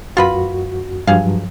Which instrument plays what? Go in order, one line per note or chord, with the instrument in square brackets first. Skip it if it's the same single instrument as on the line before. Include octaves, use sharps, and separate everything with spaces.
[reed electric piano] F#2 F#4 [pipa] F4 B4 B5
[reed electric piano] G2 F3 F#3 [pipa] G#4 F5